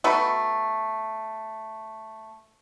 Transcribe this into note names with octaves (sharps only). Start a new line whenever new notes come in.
A3 B3 D#4 F#4